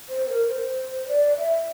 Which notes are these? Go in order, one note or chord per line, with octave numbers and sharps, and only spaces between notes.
C5
A#4
C5
D5
E5